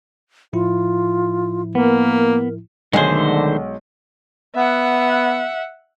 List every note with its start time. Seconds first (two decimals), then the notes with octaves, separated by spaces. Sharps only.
0.53 A2 F3 E4 F4
1.75 A#3 B3 A#4
2.93 B1 D3 D#3 G#3 A3 G#4 C5
4.56 B3 E5 F#5